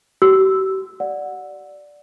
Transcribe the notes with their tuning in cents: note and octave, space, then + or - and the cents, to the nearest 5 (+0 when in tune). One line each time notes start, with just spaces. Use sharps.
G4 -45 E6 +0
D5 +0 F#5 -15